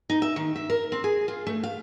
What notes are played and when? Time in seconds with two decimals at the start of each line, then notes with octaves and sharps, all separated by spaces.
0.10 D#4
0.22 E5
0.36 D#3
0.56 E5
0.70 A#4
0.92 C4
1.04 G#4
1.28 F4
1.47 A3
1.63 F5